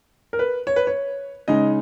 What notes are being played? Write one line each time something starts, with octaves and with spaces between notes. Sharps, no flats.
A#4
B4
C#5
B4
C#5
C#3 G#3 D#4 D#5